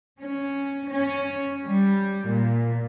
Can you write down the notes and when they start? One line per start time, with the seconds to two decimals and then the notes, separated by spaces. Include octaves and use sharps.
0.19 C#4
0.88 C#4
1.65 G3
2.28 A#2